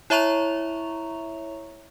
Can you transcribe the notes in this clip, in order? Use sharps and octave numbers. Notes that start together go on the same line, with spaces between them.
E4 C#5 E5 A#5 C#6 F7